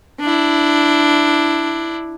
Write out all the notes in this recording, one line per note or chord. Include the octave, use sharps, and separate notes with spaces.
D4 E4